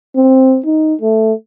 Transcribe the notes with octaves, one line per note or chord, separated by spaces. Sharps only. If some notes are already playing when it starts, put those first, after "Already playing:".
C4
D#4
A3